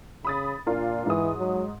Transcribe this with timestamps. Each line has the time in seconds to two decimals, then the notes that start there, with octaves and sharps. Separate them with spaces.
0.25 C#3 B5 D#6 A6
0.66 A#2 D4 F4 A#4
1.06 G#2 E3 D#6
1.38 F#3